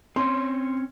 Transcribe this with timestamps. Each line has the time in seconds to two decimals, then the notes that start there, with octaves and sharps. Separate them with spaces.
0.16 C4 C#4 C#5 C6